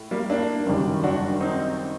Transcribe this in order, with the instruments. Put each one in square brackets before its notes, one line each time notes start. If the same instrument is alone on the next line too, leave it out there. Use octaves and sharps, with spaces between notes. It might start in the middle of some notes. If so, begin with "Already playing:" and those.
Already playing: [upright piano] A2
[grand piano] G3 A#3
A#3 D4
[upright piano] F#1 F#2 D#3 G3
[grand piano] D4 F#4
C4 D#4